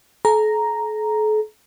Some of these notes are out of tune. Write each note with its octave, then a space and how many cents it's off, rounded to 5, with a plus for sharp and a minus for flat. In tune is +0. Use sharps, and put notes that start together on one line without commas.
A4 -45 A#5 +0